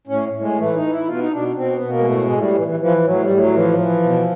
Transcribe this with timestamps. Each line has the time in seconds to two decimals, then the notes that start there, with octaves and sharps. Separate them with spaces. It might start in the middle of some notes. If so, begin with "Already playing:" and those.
0.07 A2 C#4
0.33 A2
0.40 G#3
0.57 E3 A3
0.74 D#4
0.82 E3
0.91 E4
1.07 B2 F4
1.19 D#4
1.31 B2 D4
1.56 B2 C4
1.73 B3
1.81 B2
1.89 A#3
1.98 G#3
2.06 A2 A3
2.22 G#3
2.30 A2
2.38 G3
2.55 E3
2.67 E3
2.80 E3 F3
3.04 A2 F#3
3.21 G3
3.30 A2
3.37 F#3
3.54 E3 F3
3.79 E3
4.03 B2